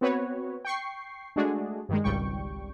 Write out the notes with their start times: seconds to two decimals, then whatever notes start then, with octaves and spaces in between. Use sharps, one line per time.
0.01 B3 C4 F#4 B4 C#5
0.65 G5 C#6 C7
1.36 G#3 A3 D4 F#4 G#4
1.89 G2 D#3 G#3
2.04 G#1 C#2 G3 G5 C#6